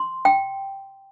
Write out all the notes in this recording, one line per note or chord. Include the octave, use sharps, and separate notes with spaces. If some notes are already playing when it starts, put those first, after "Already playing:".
Already playing: C6
G5